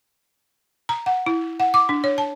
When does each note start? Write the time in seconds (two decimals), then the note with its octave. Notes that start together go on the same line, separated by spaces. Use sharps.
0.89 A#5
1.06 F#5
1.26 E4
1.60 F#5
1.74 D6
1.89 D4
2.04 C#5
2.18 A5